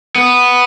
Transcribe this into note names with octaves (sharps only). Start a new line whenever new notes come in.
B3